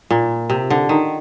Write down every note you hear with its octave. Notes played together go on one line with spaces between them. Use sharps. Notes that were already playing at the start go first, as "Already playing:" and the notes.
A#2
C3
D3
D#3